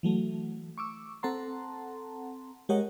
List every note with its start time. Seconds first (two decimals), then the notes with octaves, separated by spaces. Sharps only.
0.03 E3 F#3 A3
0.78 C#6 D6 E6
1.23 C4 A4 F#5 A5 A#5 C6
2.69 G#3 G4 A#4 C#5 D#5 F#5